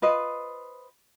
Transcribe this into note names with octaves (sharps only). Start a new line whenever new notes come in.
F4 B4 C5 D#5